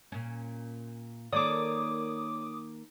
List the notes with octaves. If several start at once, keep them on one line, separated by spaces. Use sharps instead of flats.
A#2 C#4
D#3 A#3 A4 C#5 D5 D6 D#6